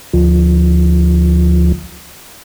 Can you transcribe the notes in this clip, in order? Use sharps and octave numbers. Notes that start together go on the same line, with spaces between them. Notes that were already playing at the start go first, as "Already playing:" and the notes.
D2 F3